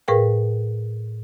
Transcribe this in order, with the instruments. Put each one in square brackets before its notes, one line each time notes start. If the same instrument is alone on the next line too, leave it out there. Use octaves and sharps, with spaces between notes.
[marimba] A2 G#4 A#4 B4 F5 G5